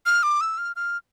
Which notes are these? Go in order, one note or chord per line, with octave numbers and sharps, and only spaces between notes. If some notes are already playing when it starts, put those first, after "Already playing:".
F6
D6
E6
F6
F6